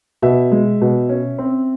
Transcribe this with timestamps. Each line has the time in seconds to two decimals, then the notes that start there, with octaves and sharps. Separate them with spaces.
0.22 B2 E5
0.52 G#3
0.81 B2
1.09 C#4
1.38 C4